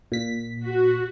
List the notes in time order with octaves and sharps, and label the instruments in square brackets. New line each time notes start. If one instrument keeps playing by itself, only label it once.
[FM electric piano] A#2 B6
[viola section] F#4